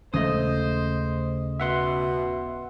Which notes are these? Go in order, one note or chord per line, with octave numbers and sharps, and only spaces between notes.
D#1 C#3 E3 G#3 A3 C5 D#5 D#6
B2 E5 F#5 C6